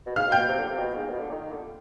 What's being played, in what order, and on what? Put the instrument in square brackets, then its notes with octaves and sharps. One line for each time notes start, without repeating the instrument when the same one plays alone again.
[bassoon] B2
[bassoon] G#2 [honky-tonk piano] F5 F6
[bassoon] B2
[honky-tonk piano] G5 G6
[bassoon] B2
C3
D3
C3
B2
G#2
B2
D3
D#3
D#3
D3